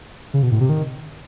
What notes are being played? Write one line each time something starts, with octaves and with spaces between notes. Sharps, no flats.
C#3
B2
A2
C3
D#3